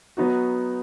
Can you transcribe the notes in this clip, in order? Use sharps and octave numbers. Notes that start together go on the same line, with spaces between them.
F#3 B3 D#4 F#4